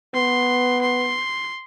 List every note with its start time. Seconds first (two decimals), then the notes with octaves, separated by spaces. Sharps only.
0.15 B3 C6
0.82 C6